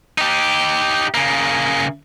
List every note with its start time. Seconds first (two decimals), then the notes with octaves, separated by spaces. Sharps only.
0.18 D#4 G4
1.15 C#3 A#3